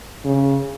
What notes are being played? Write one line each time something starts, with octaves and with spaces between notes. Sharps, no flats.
C#3